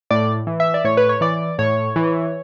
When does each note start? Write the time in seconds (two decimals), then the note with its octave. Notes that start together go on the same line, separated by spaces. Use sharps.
0.11 A2 D5
0.47 E3
0.60 E5
0.74 D5
0.84 A2 C#5
0.97 B4
1.09 C#5
1.21 E3 D5
1.59 A2 C#5
1.96 E3